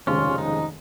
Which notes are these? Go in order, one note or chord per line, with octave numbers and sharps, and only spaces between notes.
F1 D#2 C#3 F3 G#3 C#4 F4
D#4